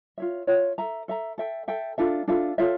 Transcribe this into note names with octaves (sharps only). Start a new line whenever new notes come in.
F4 C#5 E5
F4 C#5 E5
A4 E5 A#5
A4 E5 A#5
A4 E5 G5
A4 E5 G5
D4 F4 A4 E5
D4 F4 A4 E5
F4 A4 C#5 E5